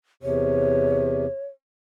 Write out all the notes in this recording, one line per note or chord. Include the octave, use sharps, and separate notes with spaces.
E2 C3 C#5